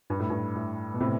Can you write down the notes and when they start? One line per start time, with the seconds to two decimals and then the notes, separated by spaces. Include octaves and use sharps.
0.10 G2
0.20 A2
0.30 G2
0.56 A2
0.94 B2
1.00 A2 C3